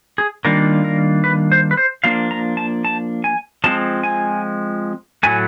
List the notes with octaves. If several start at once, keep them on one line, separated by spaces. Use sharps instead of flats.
G#4
D#3 G3 A#3 D4 F4 A#4
A#4
B4
C5
B4
C5
F3 A#3 D4 F4 F5
A#5
A5
A5
G#5
F3 G#3 C4 F4 A5
G#5
A2 F#3 A3 G#5